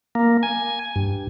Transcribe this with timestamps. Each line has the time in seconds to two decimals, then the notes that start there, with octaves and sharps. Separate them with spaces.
0.15 A#3
0.43 G#5
0.96 G2